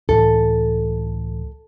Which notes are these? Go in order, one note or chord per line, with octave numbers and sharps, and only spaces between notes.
C#2 A2 E3 A4